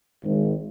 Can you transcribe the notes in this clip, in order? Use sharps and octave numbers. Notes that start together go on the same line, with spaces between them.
G#1